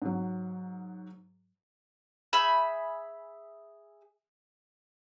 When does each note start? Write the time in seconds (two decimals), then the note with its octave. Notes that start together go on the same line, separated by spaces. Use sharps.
0.02 G#2 F#3
2.33 G#4 E5 B5 G6